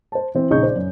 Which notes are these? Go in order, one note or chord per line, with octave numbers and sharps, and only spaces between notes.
C5 A5
E3 C4
A#1 C#3 D#4 D#5 C#6 G6
C5 D5
F#2